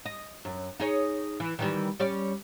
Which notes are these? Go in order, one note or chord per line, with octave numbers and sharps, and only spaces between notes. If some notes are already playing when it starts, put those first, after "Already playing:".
D#5
F#2
D#4 G#4 C#5
E3
D#3 E3 G3
G3 C#4 D5